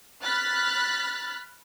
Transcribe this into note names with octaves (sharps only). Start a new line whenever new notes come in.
B5 F6 F#6 A6 B6